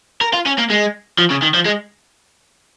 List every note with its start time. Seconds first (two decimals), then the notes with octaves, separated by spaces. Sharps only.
0.21 A#4
0.33 F4
0.46 C#4
0.58 A#3
0.70 G#3
1.18 F3
1.30 C#3
1.42 D#3
1.54 F3
1.66 G#3